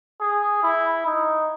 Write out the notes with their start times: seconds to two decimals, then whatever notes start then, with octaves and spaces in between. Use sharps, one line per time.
0.20 G#4
0.63 E4
1.06 D#4